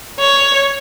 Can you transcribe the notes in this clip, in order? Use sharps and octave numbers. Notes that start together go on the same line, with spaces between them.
C#5